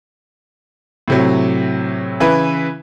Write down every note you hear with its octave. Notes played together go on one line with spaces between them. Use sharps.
A2 C3 F#3
C#3 E3 E4 B4